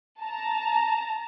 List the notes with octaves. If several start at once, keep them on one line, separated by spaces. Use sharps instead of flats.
A5 A#5